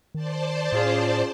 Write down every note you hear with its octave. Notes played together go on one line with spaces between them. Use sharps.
D#3 C5 D5 A5
A2 C#4 F4 G#4